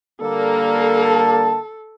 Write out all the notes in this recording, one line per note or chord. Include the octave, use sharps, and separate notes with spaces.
D3 G3 A#3 A4
A5